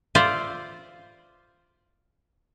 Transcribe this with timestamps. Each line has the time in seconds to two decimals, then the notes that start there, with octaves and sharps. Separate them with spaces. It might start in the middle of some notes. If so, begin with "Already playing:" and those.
0.15 F4 C5 D5 E5